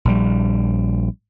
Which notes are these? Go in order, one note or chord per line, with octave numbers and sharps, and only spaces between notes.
A#1 G3